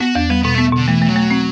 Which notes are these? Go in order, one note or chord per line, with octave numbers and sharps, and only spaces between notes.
B3 F#4
E2 D4
G3 B3
B2 B3
A3 B3
B2 D3
E3 A3
A3
F#3
A3
C4